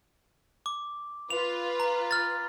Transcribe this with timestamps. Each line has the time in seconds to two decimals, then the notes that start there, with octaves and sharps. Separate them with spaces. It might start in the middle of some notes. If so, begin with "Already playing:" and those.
0.66 D6
1.30 F4 B4 F7
1.80 A#5
2.11 F6 A6